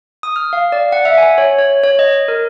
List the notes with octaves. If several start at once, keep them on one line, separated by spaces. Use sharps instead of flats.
D#6
F6
F5
D5
F#5
E5
G#5
C#5
C#5
C#5
D#5
A#4